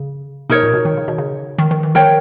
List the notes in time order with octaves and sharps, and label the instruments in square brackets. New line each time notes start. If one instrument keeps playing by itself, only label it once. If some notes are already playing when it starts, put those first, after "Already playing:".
Already playing: [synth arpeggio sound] C#3
[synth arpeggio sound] B2 [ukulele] D#4 A#4 C#5
[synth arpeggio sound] A#2
B2
D#3
C#3
B2
C#3
D#3
D#3
E3
[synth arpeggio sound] D#3 [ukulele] A#4 C#5 G5